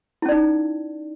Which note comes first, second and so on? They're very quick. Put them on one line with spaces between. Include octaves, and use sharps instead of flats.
E4 C#4 D5 D#4